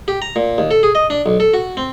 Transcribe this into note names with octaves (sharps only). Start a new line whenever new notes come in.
G4
A#5
A#2
D#2
A4
G#4
D#5
D4
B1
A4
F#4
C4